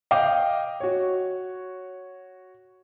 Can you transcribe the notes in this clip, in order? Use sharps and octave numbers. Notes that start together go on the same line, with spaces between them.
D#5 F5 G5 D6
F#4 C#5